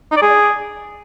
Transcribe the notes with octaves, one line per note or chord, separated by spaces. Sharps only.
D#4
D5
G#4